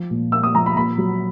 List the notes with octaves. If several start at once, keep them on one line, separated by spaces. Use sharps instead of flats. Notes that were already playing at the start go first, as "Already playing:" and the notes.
Already playing: F3
A#2
A#3 E6
D#6
F3 A#5
B5
A#2 B5
F#3